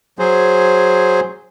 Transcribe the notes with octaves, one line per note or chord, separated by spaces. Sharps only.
F#3 G#4 C5